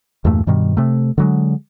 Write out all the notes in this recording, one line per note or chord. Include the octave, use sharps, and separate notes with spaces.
E2 G2 A#2 A3
G2 B2 D#3 G3
C3 A3
D3 F#3 G#3